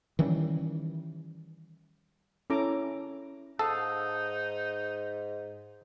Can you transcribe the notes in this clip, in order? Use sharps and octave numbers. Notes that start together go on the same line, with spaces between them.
D#3 E3 G3 C#4
C#4 E4 A4 A#5 D6
G#2 D#4 A4 F5 F#5 D#6